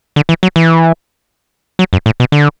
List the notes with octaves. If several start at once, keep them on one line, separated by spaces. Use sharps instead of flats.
D3
E3
F#3
E3
F#3
F#2
A2
B2
D3